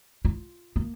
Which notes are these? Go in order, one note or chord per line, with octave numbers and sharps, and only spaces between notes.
F4
A#3